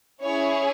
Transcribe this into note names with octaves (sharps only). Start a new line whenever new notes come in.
C#4 E4 G#4 C#5